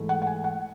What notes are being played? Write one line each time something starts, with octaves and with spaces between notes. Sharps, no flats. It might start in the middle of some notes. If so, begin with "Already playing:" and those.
Already playing: G#2 E3 A3
F#5
F#5
G#5
F#5